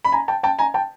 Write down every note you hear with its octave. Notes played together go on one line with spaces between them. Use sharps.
B5
G#5 A#5
G5 A5
G5 A5
G#5 A#5
G5 A5